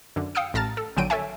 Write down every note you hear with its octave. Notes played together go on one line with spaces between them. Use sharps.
F#2 D3
F5 G5 D#6 E6 C#7
A1 A2 A5 A#5 F6 A6
A4
A#1 D3 F#3 G5 D7 D#7
A4 C#5 E5 G#5